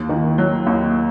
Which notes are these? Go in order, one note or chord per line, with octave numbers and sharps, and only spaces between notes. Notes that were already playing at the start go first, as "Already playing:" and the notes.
Already playing: D#2
D#3
F#3
D#2